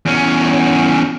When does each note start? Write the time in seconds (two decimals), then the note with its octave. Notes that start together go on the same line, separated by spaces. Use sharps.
0.05 E2 C#4